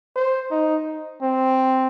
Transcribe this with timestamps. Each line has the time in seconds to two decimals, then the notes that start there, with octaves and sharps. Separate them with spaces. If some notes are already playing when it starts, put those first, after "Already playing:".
0.16 C5
0.51 D#4
1.22 C4